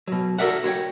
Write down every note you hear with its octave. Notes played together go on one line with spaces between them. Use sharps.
B2 F#3
F#4 A4 A#4 D5 E5 F#5
F#4 C#5 G5